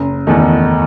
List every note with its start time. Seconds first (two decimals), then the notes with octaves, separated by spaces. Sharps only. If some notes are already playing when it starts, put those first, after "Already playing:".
Already playing: F#1
0.27 E2 D#3 A3 D#4